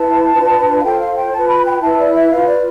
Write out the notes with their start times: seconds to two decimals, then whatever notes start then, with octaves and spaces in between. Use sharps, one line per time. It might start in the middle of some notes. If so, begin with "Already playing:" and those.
Already playing: E4 B4 A5
0.34 D4 F4 B4
0.79 F5
0.83 F4 A4 C5 G5
0.99 F5
1.15 G5
1.32 F4 B4 A5
1.49 B5
1.65 G5
1.81 E4 B4 A5
1.98 D5
2.14 E5
2.30 F4 B4 F5
2.46 D5